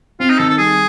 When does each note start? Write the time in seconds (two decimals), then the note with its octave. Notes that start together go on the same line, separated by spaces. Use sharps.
0.20 C4 F4
0.30 D#4
0.39 D#3 A4
0.49 A4
0.58 G3 G#4